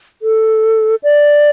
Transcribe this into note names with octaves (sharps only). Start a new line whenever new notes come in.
A4
D5